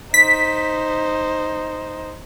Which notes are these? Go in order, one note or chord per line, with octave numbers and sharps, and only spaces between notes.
D#4 C5 B6